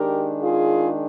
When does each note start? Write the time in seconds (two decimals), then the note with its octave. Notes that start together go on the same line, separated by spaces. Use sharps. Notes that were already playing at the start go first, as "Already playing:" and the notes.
Already playing: D#3 G#3 D4 G4 A#4
0.43 F4 G#4